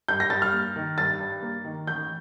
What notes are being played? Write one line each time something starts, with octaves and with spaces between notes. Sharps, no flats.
G2 G6
A#6
G2 A6
F6
A#3
D#3
G2 A6
G2
A#3
D#3
A1 G6